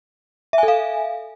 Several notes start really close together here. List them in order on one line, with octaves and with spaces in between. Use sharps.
E5 G#5 A4 F5